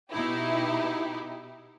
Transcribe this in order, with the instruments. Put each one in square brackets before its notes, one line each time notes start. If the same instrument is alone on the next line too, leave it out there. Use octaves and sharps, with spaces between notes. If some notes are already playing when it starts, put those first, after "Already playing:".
[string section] B2 D#4 E4 G4